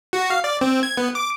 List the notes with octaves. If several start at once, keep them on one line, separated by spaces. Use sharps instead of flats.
F#4
F5
D5
C4
G#6
B3
D6